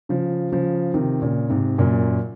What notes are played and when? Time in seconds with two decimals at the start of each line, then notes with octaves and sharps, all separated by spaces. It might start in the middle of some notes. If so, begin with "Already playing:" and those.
0.09 C#3 F3
0.52 C#3 F3
0.94 C3 D#3
1.22 A#2 C#3
1.50 G#2 C3
1.78 F#2 A#2